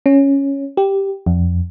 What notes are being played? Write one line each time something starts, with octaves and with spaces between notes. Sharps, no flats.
C#4
G4
F2